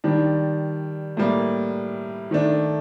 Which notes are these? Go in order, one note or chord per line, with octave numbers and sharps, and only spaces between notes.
D#3 G3 D4
A2 G3 A#3
D#3 A3 D4